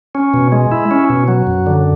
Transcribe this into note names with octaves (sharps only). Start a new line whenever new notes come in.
C#4
B2
G#3
E4
C#4
B2
F#3
F#2
D3